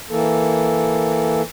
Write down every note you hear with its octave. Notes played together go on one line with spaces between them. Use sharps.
E3 A#3 A4